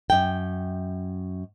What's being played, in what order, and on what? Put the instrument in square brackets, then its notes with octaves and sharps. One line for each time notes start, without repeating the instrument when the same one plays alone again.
[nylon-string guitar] F#2 G5